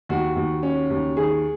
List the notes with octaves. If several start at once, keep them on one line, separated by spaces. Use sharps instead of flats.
D#2 F#4
D#2
C#4
D#2
D#3 G#4